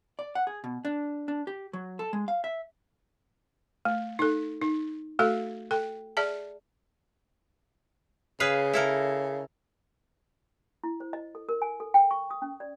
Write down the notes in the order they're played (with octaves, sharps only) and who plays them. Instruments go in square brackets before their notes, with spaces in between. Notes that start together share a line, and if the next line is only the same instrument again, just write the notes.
[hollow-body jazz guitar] D5
F#5
G#4
B2
D4
D4
G4
F#3
A4
G#3
F5
E5
[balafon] A3
D#4 A4
D#4
A3 F#4 A4 E5
A4 G5
G#4 D5 E5 A5
[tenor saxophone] C#3 [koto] G#4 B4 F5
[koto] E4 A4 A#4
[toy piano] E4
C5
D#5
A4
A#4
G#5
A4
G5
C#6
D#6
C#4
D5